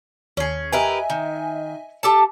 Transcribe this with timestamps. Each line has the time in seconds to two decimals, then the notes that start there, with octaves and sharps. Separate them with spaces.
0.37 D#2 C#4 G#4
0.72 G4 A#4 B4 D#5 E5 G#5
1.10 D#3
2.03 G4 A4 A5